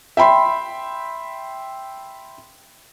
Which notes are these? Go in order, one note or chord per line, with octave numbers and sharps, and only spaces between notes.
E5 G5 B5 C6